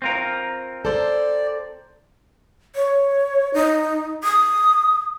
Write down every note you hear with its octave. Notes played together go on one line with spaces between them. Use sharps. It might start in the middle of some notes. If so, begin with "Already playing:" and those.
C4 F4 A#4
A4 C5 D5
C#5
D#4
D#6